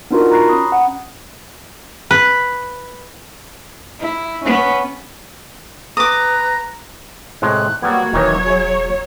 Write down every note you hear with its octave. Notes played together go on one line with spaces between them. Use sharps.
B3 D4 D#4 F4 F#4 A#4
A#5 B5 C#6 F#6 A#6 C7
C#4 B5 D#6
F#5
B4
E4
B3 C#4
B4 A#5 D6 D#6
A2 C3 G#3 F#6
F#3 G3 A#3 B3 F#4 G#6
E1 D#3 E3 F#3 D#4 C#5
G#4 E5